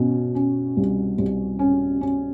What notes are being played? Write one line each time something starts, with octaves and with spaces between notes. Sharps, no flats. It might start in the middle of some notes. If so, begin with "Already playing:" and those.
Already playing: B2 C#4
C#4
C2
C2
C#4
C#4